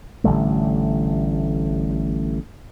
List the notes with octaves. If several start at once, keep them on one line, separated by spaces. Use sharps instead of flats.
A1 D3 G3 A3